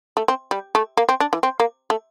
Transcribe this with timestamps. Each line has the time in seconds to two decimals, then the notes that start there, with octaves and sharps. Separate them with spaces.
0.17 A3
0.28 C4
0.51 G3
0.75 A3
0.97 A#3
1.09 C4
1.20 D4
1.33 E3
1.43 C4
1.60 A#3
1.90 A3